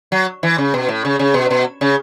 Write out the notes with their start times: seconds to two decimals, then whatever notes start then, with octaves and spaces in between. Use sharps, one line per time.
0.12 F#3
0.43 E3
0.58 C#3
0.74 B2
0.89 A2
1.05 C#3
1.19 C#3
1.34 B2
1.50 B2
1.81 C#3